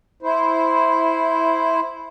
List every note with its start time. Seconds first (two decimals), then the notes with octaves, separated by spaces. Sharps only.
0.23 E4 C5